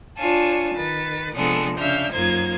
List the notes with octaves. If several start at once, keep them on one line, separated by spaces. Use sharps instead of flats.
D4 F4 C#5 G#5 A5
D#3 B4 A6
C3 F3 G#3 B3 D4 A4
C#3 D4 E5 F5 F6 G6
F#2 A#3 D#4 F4 C5 G#6